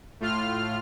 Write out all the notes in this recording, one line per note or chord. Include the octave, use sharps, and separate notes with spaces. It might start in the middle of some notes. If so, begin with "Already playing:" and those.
A2 F4 F6